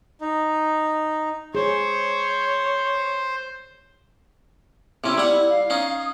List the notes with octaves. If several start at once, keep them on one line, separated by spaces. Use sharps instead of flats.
D#4
G#4 C5 C#5
C3 C#4 E4
G3 F#5
E4
F5
C#4 D#4
D#6